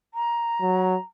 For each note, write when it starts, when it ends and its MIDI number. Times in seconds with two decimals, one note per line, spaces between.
0.14 0.98 82
0.62 0.95 54